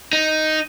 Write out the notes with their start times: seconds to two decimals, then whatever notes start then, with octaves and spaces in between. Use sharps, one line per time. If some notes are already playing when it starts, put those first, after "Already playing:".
0.13 D#4